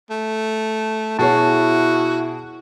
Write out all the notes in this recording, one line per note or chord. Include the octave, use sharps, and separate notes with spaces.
A3
B2 E4 F#4 G#4 C#5 A5